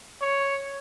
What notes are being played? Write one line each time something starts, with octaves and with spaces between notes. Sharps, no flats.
C#5